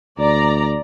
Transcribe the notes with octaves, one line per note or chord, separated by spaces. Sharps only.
D2 D5 A#5